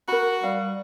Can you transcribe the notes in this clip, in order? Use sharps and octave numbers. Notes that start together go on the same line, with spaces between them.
F#4 A#4 B5
G3 F5